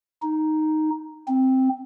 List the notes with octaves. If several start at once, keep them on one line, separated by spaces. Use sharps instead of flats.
D#4
C4